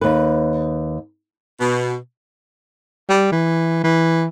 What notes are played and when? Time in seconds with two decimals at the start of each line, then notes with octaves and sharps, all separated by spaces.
0.01 D#2 B4
1.60 B2
3.09 G3
3.32 E3
3.84 E3